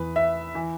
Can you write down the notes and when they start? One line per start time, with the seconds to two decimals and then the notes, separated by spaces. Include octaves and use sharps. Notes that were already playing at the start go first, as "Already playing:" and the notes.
Already playing: E2 E3 B4
0.16 E5
0.55 E3